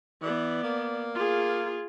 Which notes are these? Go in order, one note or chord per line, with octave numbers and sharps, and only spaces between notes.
E3 B3 D5
A#3
F4 G#4